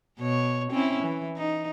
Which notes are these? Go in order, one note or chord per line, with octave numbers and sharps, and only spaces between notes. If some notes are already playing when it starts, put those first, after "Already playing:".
B2 C#5
C4 C#4 E4
E3
D#4